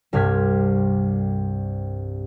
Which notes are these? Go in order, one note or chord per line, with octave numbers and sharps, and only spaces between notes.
C2 G2 C3 F6 G#6 B6